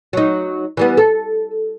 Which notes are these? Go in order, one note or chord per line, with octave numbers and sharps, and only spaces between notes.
F#3 D#4
E3 G3 B3
A4